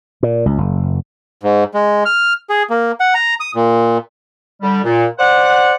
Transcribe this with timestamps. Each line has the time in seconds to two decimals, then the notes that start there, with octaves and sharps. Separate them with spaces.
0.23 A#2
0.46 C#2
0.58 F#1
1.43 G#2
1.74 G#3
2.06 F6
2.50 G#4
2.70 A#3
3.00 F#5
3.14 A#5
3.40 D#6
3.55 A#2
4.62 D3 G3
4.83 A#2
5.18 C5 D5 F#5